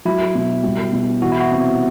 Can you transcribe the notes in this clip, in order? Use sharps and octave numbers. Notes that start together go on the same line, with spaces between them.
F#3 E4
B2
G3
B2
E3 F#4
E4
F#4
C3